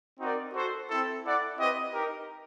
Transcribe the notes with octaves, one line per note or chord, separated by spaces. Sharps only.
C4 D#4 F#4 A#4 D5
F#4 A4 C5
C4 E4 A4
E4 A4 D5 F#5
C4 E4 G4 B4 D#5
D#4 G4 A#4